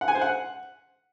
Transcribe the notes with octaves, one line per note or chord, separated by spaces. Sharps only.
F#5
G#5
C5
F#5